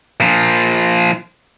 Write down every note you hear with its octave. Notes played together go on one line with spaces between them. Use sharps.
A#2 F3